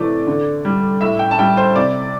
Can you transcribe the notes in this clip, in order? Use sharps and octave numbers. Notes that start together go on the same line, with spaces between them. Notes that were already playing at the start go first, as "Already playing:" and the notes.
Already playing: C3 E3 A3 D5
D3
G3
A2 E5
G5
A5
G3 G5
C5
C3 D5